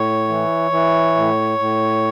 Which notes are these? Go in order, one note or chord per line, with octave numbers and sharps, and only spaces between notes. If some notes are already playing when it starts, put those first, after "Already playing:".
Already playing: A2 C#5
E3
E3
A2
A2